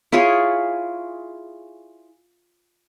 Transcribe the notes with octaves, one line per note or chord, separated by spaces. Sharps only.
E4 F4 G#4 C#5